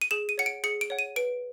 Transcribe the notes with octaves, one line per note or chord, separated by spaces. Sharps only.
D#7
G#4 E7
D#7
C#5 F#5 C#7
D7
G#4 C#7
D7
C#5 F#5
D#7
B4 D7